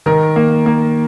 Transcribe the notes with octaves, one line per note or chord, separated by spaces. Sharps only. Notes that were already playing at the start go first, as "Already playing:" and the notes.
D#3 A#4
A#3
A#3